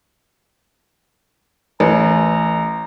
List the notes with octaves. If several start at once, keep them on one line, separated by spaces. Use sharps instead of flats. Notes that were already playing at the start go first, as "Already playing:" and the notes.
A1 A#5